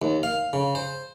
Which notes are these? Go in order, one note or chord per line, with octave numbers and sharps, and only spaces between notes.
D#2
F5
C#3
C5